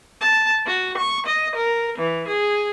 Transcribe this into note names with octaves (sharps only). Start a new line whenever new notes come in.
A5
F#4
C#6
D#5
A#4
E3
G#4